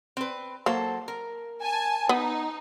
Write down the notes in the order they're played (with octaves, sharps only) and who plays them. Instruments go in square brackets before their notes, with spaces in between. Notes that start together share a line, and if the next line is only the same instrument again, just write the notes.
[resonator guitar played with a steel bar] C4 B4
[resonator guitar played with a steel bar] F#3 A4 C5 [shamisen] A#3
[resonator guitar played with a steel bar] A#4
[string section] G#5 A5
[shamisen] B3 [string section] D#4